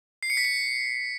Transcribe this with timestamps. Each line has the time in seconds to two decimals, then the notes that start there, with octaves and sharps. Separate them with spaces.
0.23 C7
0.30 C#7
0.37 B6
0.45 C#7